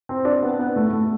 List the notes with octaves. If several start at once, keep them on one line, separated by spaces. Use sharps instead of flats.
C4
D4
B3
B3
A3
A3